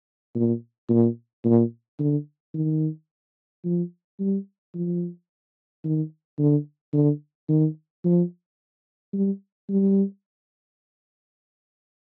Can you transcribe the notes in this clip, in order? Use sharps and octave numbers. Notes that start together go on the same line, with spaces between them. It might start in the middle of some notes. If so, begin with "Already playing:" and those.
A#2
A#2
A#2
D3
D#3
F3
G3
F3
D#3
D3
D3
D#3
F3
G3
G3